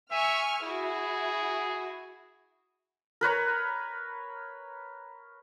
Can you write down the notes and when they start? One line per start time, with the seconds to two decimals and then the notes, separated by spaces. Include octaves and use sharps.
0.12 E5 G#5 C#6 F6
0.61 E4 F#4 G#4
3.21 A#4 B4 C#5 A#5